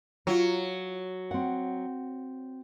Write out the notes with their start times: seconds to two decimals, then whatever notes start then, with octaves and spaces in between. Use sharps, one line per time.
0.27 F#3 F4 C#5
1.31 C4 F#5